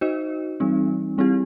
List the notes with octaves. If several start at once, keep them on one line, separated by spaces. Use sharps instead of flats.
D#4 F#4 C5 D#5
E3 G3 C4 D#4
G3 C4 E4 G4